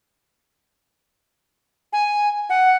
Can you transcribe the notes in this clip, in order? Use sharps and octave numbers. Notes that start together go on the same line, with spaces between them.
G#5
F#5